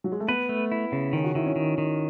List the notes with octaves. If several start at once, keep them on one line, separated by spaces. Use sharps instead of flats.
F#3
G#3
A3
B3 B4
A3
E4
C#3
D#3 C#4
F#4
D#3 E4
C#4
D#3
D#3